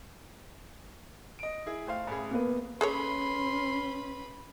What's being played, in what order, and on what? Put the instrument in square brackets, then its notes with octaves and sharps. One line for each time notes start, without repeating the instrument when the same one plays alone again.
[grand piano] D#5 D7
E4 G#4
[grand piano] A3 C5 F5 [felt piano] G5
[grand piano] A1 A3 G#4 [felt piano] B5
[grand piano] F1 [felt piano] A#3 B3 B4
[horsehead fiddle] C#4 [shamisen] G#4 A4 C#5 [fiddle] B4 B5 [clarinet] C6